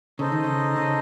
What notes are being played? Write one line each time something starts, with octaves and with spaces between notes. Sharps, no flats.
C#3 D#4 A4 C5 D#5
D#3
C#3
C#3